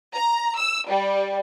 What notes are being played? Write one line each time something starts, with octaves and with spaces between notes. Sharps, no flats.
A#5
E6
G3